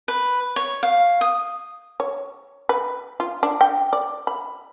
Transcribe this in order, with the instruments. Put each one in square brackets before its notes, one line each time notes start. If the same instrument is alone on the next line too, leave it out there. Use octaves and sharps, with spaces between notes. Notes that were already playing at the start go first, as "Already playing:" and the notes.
[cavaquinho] B4
C#5
F5
D#6
[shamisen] C#5
B4
F4
D4
G5
D5
B5